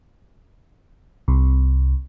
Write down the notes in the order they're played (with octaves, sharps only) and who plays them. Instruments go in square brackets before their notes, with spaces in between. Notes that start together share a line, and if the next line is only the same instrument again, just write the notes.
[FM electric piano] C2